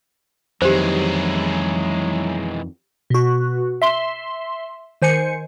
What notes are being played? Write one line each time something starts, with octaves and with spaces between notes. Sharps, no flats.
F2 D#3 E3 F#3 G#3 G4 C5
B2 F#4
E5 C6
D#3 C5 G#5 C#7